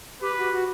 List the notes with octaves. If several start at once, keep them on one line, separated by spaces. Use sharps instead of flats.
G4 B4
F#4
F#4